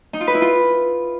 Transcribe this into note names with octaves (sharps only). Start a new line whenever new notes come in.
D#4
F4
B4
E4
F4